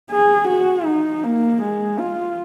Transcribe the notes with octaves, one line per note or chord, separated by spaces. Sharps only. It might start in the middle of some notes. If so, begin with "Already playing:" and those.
G#4
F#4
D#4
A#3
G#3
F4